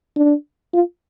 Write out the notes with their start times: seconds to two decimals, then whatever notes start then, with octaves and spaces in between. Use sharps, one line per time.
0.17 D4
0.73 F4